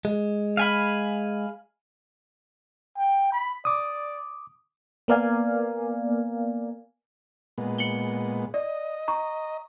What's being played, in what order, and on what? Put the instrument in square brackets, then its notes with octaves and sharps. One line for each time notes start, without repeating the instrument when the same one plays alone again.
[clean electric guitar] G#3
[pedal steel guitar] F5 G#5 B5
[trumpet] G5
B5
[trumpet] D5 [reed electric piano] D6 D#6
[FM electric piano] A#3 B3 A#4 D5 F5 G#5
[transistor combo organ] A#2 G#3 B3
[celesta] C#7 F#7 G7
[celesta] D5 [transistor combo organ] D#5
[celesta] A#5 C#6